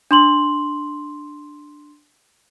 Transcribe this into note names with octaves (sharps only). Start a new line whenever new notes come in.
D4 C6 F#7